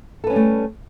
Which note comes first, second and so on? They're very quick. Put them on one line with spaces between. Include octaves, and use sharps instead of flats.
A4 B4 C#4 G3 A3